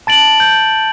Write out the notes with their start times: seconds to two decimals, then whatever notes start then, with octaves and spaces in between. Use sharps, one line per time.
0.07 A5 A6 D7 F#7
0.40 G6